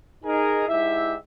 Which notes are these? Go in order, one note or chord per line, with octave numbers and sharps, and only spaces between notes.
D#4 G#4 A#4
G#2 E4 G4 E5